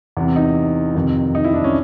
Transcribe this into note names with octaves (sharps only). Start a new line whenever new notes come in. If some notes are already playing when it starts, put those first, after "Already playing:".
E2 C3 E3
D#4
F2 C3 D#3
D#4
E4
D4
C#4